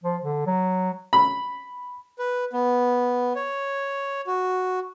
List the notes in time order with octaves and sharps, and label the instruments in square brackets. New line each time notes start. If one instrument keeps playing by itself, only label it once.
[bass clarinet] F3
D3
F#3
[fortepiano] B5
[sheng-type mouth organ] B4
B3
C#5
F#4